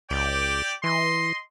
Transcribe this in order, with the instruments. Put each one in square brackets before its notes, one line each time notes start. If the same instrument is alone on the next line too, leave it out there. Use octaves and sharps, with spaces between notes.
[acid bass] C#2 [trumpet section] G4 D5 G5
[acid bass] E3 [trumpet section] D#5 C6